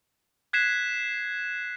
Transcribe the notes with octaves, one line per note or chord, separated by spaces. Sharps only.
F#6 G#6 B6 C7 E7